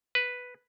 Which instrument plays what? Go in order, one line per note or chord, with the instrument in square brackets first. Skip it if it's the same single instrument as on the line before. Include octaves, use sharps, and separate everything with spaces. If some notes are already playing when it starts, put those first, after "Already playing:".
[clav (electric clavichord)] B4